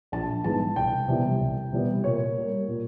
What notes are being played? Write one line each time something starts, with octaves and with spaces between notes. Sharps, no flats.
A#1 A5
G#2 E3 G#3 B3 A5
C2 G5
C3 E3 G3 B3
C2
C3 E3 G3 B3
A#2 C#5
G3 A#3
A#2